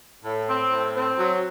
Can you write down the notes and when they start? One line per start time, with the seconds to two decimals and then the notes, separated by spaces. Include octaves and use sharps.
0.24 A2
0.48 C4
0.71 A2
0.94 C4
1.18 F#3